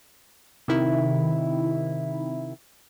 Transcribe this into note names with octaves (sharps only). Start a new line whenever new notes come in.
C3 D#3 E4